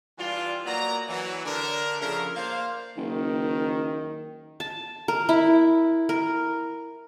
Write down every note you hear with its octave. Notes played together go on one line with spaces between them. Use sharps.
E3 G3 D4 F4
F#3 A#3 B3 D5 A#5
E3 F#3
D3 D4 A#4
C#3 F3 A3 A#4
A#3 C5 D5 F5
F#1 D#3
A5
A#4
E4
A#4